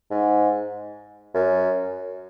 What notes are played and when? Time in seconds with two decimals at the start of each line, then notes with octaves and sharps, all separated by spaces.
0.10 G#2
1.34 F#2